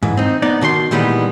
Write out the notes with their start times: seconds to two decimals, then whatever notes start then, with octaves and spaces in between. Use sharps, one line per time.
0.03 G#2 E3
0.17 C4 D#4
0.42 B3 D#4 D5
0.61 B2 D#3 C5 C6
0.91 A#2 D#3 E3 G3 G#3 B3